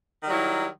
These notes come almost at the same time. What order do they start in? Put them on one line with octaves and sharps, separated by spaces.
D#3 G3 F#3 E4